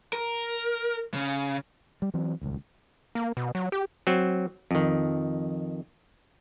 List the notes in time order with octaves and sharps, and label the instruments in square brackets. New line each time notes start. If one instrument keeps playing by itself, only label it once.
[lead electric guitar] A#4
C#3
[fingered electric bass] G3
E3 F#3 C4
D#1 C#2
[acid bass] A#3
B2
F#3
G4
[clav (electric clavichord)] F#3 C4
F2 D#3